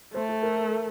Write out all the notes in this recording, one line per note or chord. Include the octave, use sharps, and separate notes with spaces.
A3 C5
A4
A#4